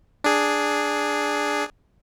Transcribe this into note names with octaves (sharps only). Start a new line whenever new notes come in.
D4 G#4